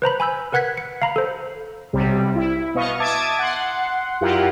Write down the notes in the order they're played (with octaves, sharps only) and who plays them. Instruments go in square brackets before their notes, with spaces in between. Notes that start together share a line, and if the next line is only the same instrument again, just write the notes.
[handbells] B4 C5 A#5 B5
G#5 B5 E6 G6
A#4 B4 F#5 F#6 G#6 B6
C#7
F5 A#5 B5
A4 C5
[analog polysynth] B1 C3 G3
E4
B2 B3 D#5 F5 C#6
E5 A5 D6 D#6 G#6 A6
F#5 C6
F#2 E4 F4 G4 A#4 F#5